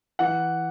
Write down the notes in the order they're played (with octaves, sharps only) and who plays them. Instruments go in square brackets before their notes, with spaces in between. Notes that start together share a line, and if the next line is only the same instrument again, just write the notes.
[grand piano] E3 F#5